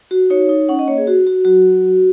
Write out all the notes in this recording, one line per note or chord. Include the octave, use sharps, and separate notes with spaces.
F#4
D#4 C#5
D#4
C#4 F#5
D#5
A#3 C#5
G#4
F#4
F#4
F#3 F#4